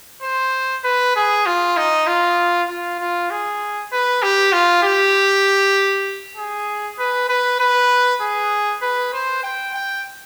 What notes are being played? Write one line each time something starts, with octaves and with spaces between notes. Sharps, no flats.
C5
B4
G#4
F4
D#4
F4
F4
F4
G#4
B4
G4
F4
G4
G#4
B4
B4
B4
G#4
B4
C5
G5
G5